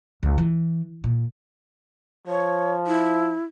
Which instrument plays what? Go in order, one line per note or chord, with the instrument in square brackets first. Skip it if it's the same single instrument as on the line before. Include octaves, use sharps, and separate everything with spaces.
[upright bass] C#2
E3
A#2
[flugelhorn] F3 [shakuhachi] C#5
[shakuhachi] E4